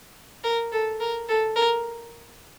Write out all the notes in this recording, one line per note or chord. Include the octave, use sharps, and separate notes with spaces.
A#4
A4
A#4
A4
A#4